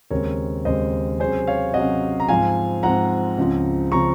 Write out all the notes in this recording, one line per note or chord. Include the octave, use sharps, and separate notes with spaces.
D#2 C#3 G#3 C4 A#4 C#5
D#2 C#3 G#3 C4 C5 D#5
C3 F#3 C#4 G#4 C5
C#5 F5
C3 F#3 C#4 D#5 F#5
A#5
G#2 F3 C4 F5 G#5
G#2 F3 C4 F#5 A#5
C#2 C#3 F3 C4
C#3 F3 C4 A#5 C#6